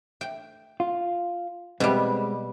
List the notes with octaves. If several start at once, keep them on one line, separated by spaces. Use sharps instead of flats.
G5
F4
B2 G3 G#3 C4